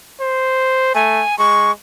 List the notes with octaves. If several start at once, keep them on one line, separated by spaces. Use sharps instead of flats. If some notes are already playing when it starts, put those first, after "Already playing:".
C5
A3 G#5
G#3 C#6